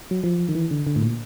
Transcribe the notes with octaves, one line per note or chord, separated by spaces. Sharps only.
F#3
F3
D#3
E3
D3
D3
A2
A#2